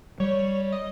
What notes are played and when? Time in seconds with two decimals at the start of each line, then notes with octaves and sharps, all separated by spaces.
0.20 G3 C#5
0.72 D#5